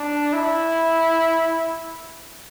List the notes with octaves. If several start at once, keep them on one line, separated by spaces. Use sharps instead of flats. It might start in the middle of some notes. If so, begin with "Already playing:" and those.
Already playing: D4
E4